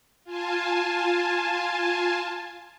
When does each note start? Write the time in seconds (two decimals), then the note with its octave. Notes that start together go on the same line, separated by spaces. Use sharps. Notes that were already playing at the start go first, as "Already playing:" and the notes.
0.24 F4 G#5 A5